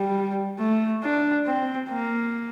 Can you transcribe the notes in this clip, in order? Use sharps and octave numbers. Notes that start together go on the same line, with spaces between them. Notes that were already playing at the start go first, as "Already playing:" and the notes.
Already playing: G3
A3
D4
C4
A#3